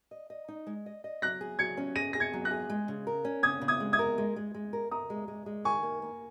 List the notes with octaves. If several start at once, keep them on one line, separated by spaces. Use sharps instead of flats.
D#5
D#5
D#4
G#3
D#5
D#5
F#3 F#6 A#6
G#4
F#3 G#6 C#7
C#4
G#4 A#6 D#7
G#4 A#6
G#6 C#7
F#3
F#6 A#6
G#4
G#3
C#3
A#4
C#4
C#3 D#6 G#6
C#3
D#6 G#6
G#3
D#6 G#6
A#4
G#3
G#3
G#3
A#4
A#4 A#5 D#6
G#3
G#3
G#3
D#3 G#5 C#6
A#3
A#3